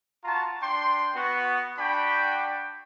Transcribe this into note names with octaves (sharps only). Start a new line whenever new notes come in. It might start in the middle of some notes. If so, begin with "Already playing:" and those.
F4 F#4 A5 A#5
D4 G5 C6
B3 F#4
D4 F#4 G5 B5